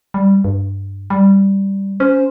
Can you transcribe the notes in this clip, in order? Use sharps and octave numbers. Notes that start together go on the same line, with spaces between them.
G3
G2
G3
C#4 C5